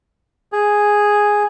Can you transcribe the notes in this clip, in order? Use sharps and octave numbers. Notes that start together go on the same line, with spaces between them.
G#4